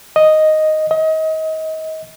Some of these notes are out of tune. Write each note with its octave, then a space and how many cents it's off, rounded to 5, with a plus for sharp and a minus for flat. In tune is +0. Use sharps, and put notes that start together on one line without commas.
D#5 +0
D#5 +30